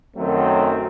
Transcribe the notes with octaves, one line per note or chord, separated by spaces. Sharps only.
F#2 D#3 F#3 A3 C4